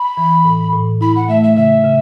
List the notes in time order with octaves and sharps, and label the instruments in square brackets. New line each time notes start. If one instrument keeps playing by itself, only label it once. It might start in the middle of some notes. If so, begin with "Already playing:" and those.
Already playing: [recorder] B5
[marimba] E3
A2
A2
[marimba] E4 [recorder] B5
[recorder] F#5
[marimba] A3 [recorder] E5
[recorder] E5
[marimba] C#3 [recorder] E5
[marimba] C#3